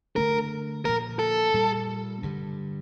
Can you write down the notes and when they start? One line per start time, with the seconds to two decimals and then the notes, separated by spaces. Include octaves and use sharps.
0.16 D3 A3 D4 A#4
0.85 A#2 F3 A#3 A#4
1.19 A4
1.54 A#2 G3 A#3
2.23 G2 D3 G3